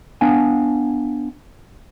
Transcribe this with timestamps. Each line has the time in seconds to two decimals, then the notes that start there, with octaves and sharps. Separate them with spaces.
0.21 B3 D4 F5 G#5